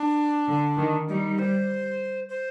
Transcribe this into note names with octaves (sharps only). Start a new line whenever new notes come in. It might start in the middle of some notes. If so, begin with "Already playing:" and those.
Already playing: D4
D3
D#3
G3 D#4
C5
C5